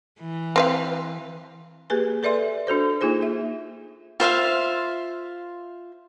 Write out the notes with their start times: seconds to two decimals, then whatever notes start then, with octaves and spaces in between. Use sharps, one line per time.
0.20 E3
0.56 C4 B4 F5
1.90 A#3 G4 G#4 B4 G#5
2.23 A4 B4 D5 E5 C6
2.67 D4 F#4 A4 C5
3.01 A#3 D#4 F4 G#4 C5
3.22 E5
4.20 F4 C5 E5 F5